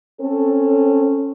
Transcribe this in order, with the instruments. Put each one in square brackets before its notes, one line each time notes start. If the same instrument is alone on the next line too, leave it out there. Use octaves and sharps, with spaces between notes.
[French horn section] C4 C#4 A4